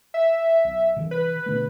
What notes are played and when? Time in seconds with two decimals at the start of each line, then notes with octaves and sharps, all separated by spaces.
0.14 E5
0.64 B1
0.96 C3 D#3 E3
1.11 B4
1.46 B2 D3 A3